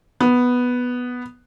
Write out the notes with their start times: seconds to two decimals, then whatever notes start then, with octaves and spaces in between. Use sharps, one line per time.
0.20 B3